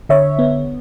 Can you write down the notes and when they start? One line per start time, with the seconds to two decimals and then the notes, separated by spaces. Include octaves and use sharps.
0.09 D3 C#5 E5
0.39 B3